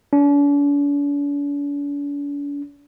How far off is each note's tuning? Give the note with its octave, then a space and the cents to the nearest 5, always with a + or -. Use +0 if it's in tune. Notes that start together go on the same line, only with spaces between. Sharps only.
D4 -45